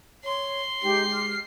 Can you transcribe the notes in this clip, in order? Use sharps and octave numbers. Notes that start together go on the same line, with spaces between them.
C#5 C6
G#3 D#4 G4 C7
F6